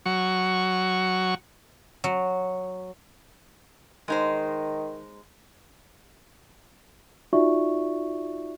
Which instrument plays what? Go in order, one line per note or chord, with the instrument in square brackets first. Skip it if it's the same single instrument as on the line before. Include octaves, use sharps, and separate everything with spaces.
[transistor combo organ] F#3 C#6
[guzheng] F#3
[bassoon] D#3 [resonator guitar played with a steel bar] G#3 D#4 C5
[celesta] D#4 F4 F#4 D5 E5 C#6